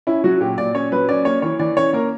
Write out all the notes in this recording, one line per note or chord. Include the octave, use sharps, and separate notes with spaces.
C#4 E4
F#3 F#4
A#2 G4
A#2 D5
C#4 C#5
F#3 B4
C#4 D5
A#3 C#5
E3 C#5
E3 D5
C#4 C#5
A#3 A#4